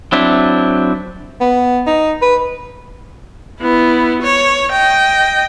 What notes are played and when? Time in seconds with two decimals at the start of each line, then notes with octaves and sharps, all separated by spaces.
0.12 F#3 C4 D4 E4
1.41 B3
1.87 D#4
2.22 B4
3.59 B3 E4
4.22 C#5
4.72 D#5 G5